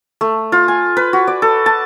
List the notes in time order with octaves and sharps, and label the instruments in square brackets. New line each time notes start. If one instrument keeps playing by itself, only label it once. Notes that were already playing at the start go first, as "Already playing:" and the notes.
[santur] A3
F4
G#5
B4
F#4
D5
A4
A5